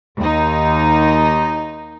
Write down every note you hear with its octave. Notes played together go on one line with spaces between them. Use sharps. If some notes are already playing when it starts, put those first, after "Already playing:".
D#2 D#4